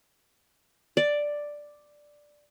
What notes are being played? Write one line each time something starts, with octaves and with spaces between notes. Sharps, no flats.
D5